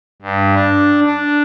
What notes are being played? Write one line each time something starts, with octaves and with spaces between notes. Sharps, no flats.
G2
D4
D4